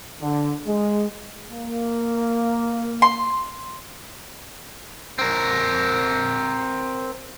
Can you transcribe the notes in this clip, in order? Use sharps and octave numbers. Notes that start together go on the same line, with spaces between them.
D3
G#3
A#3
C6
C4 A#4